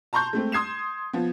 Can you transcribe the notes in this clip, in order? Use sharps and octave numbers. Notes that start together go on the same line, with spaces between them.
A5 A#5 C6 C#6 G6
G#3 A3 C4
C6 D#6 G#6 C7 E7
F3 B3